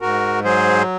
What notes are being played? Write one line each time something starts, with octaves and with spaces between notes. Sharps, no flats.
G#2 F#4 A#4
F#3 G#4 C5